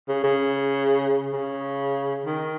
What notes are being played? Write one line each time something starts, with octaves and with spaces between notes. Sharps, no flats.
C#3
C#3
C#3
D#3